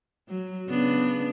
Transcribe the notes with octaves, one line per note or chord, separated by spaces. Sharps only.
F#3
C#3 B3 D4